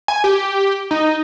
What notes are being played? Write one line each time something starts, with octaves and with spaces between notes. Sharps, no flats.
G#5
G4
D#4